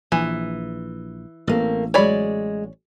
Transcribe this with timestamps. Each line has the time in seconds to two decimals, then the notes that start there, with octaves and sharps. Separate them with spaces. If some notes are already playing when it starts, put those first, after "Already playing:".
0.12 A#1 E3
1.47 A1 A3 A#3 C4
1.94 F#3 G#3 C#5 D5 B5